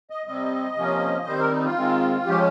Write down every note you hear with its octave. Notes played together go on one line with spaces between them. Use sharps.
D#5
C3 G3 C4 D#5
C3 F3 A#3 C#4
D#3 G3 C4 C5
A#4
D#4
F4
D#3 G#3 C4
F3 G#3 C#4 G4